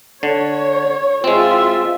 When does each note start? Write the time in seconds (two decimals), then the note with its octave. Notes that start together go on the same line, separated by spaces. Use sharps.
0.23 D3 C#5
1.24 G#3 C4 F4 E5